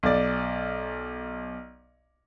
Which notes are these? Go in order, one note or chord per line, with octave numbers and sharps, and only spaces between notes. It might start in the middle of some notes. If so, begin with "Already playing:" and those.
B1 D5